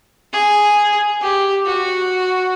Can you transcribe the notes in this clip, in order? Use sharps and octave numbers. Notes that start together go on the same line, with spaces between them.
G#4
G4
F#4